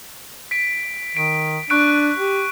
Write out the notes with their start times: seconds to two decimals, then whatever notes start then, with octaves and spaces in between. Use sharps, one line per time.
0.51 B6 D7
1.17 D#3 D7
1.70 D4 C#6 F#6 D7
2.18 G4